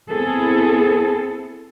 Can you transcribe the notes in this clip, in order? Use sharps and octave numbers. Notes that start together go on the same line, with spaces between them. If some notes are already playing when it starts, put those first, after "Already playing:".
B3 C4 E4 G#4 A4